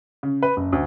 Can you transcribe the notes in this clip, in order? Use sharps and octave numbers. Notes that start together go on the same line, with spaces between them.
C#3
B4
F#1
D2